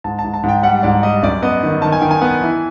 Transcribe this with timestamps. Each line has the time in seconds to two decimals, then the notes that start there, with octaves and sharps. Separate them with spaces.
0.04 G#2 A5
0.19 A5
0.24 G#2
0.34 A5
0.43 G#2 G5
0.63 G3 F#5
0.83 G#2 D5
1.03 G3 D#5
1.23 F#2 D5
1.42 B3 D#5
1.63 D#3
1.82 D#3 A5
1.92 G#5
2.01 D#3 G5
2.11 G#5
2.22 B3
2.42 E3